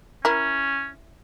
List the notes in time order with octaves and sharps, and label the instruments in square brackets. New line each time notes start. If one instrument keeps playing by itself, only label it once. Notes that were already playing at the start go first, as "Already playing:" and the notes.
[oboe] C#4 [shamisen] E4 A#4